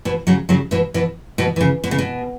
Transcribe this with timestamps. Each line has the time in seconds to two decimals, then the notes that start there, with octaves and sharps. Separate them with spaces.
0.05 B2 E3
0.27 C#3 F#3
0.49 C#3 F#3
0.71 B2 E3
0.94 B2 E3
1.38 B2 E3
1.56 E3
1.61 C#3
1.84 B2
1.91 C#3
1.98 B2